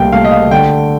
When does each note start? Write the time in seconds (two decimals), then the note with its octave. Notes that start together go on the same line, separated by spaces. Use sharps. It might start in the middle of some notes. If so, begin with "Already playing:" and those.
Already playing: C2 A#2 A3 F5 G5
0.12 A3 F5
0.25 D#5
0.31 F5
0.51 D3 G5